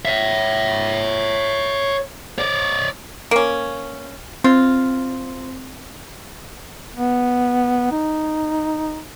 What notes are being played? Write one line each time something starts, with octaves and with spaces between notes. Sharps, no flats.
C#5 E5
C#5 D5
A#3 C#4
C4 F4
B3
D#4